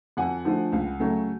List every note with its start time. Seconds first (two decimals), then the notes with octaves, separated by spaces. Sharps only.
0.17 F2 F#5 G#5
0.45 D3 F3 A3
0.72 C#2
1.00 C#3 F#3 A3